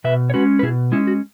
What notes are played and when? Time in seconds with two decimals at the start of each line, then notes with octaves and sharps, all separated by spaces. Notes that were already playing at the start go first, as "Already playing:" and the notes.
0.04 B2 B4 E5
0.30 C#5
0.34 G#3 C#4 F#4 B4
0.59 B4
0.63 B2 E4 G#4
0.92 G#3 C#4 E4
1.07 F#4